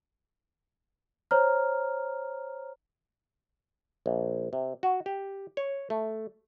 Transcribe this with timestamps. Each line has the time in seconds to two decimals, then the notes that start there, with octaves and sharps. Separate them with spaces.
1.31 C5 C#5 A#5 F6
4.06 A#1
4.53 C3
4.83 F#4
5.06 G4
5.57 C#5
5.90 A3